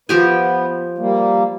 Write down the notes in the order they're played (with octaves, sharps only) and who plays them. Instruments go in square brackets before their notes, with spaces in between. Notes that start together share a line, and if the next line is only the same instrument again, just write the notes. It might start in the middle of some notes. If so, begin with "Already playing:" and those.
[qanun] F3 G4 G#5 [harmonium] B3
[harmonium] G3 A#3